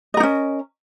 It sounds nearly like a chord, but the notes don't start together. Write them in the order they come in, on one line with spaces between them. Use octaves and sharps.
D#5 A#4 D#4 C#4